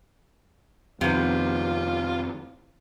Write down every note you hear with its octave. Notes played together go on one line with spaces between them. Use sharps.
F2 C3 D#3 B3 F4